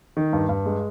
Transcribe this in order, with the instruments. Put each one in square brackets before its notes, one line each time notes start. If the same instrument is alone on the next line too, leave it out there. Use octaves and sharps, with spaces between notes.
[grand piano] D#3
G2
G2
G#3